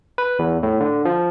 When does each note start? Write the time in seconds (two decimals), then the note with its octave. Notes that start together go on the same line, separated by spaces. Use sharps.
0.18 B4
0.39 E2
0.63 A2
0.80 D3
1.05 F3